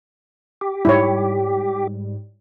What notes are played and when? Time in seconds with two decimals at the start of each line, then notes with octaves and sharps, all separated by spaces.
0.61 G4
0.85 G#2 G3 E4 C#5